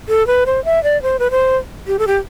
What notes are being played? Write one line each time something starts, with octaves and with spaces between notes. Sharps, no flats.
A4
B4
C5
E5
D5
C5
B4
C5
G4
A4
G4